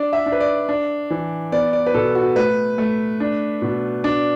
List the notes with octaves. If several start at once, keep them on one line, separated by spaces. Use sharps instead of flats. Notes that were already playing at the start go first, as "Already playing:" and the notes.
Already playing: D4 D5
E5
D4
B4
D5
D4
E3
B3 D5
D5
B4
B2 A4
F#4
A3 B4
A3
D4
B2
D4 D5